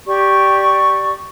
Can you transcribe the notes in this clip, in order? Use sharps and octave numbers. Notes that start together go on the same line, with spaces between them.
G4 D5 C#6